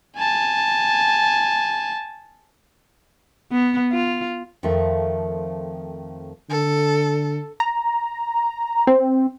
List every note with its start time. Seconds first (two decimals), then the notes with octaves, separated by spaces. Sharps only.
0.17 G#5 A5
3.52 B3
3.93 F4
4.63 F2 D#3 F3 A3 E5
6.50 D3 A4
7.60 A#5
8.87 C4